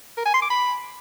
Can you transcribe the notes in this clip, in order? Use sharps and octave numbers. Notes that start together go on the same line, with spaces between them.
A#4
G#5
C6
D6
B5